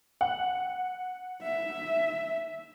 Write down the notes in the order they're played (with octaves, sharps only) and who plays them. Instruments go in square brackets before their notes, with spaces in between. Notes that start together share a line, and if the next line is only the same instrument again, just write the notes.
[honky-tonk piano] F#5
[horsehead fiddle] E5